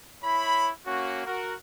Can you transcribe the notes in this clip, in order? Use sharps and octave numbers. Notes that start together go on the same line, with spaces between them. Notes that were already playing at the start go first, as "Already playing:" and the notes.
E4 C#5 B5
A#3 C#4 F#4
F#4 A#4